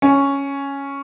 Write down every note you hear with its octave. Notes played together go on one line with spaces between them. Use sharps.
C#4